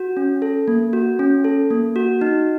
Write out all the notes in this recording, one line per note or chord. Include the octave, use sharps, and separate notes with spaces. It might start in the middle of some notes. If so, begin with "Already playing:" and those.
Already playing: F#4
C#4
A4
A#3
F#4
C#4
A4
A#3
F#4
D#4